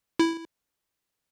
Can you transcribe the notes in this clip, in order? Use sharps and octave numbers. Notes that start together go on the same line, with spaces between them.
E4